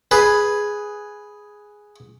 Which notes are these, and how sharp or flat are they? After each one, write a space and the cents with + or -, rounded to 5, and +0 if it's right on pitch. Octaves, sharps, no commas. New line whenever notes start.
G#4 +0 B4 +0